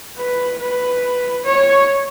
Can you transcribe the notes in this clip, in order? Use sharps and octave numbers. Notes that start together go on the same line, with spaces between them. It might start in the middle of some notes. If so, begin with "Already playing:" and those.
B4
B4
C#5